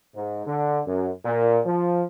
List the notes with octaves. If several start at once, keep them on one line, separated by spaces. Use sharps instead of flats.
G#2
D3
F#2
A#2
F3